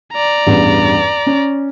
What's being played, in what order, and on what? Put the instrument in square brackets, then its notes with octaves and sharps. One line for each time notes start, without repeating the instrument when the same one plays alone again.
[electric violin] D5 A#5
[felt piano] A1 E2 G2
C#4